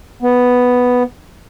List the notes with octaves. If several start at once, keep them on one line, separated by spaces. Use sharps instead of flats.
B3